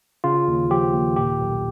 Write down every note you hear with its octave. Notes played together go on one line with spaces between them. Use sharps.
C#3 F4
D#2
F3 G4
D#2
A#2 G4
B1